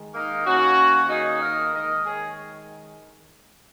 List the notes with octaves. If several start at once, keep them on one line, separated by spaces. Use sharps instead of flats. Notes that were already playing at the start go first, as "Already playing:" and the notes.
Already playing: D#3 G#3
A#3 D#4
D#3 A#3 C#4 F#4
D#4 G#4
A#4 D#5
D#3 G#3 A#4 D#5
G#4 C#5